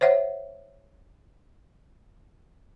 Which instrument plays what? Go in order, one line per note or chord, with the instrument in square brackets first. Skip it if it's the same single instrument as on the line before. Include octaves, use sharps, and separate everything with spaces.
[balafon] C5 C#5 E5 F#5